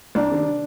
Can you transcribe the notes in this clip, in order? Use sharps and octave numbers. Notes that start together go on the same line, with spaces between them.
C2 D4
C3 D#3